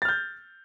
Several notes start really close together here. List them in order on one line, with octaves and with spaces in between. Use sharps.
A6 F6 G6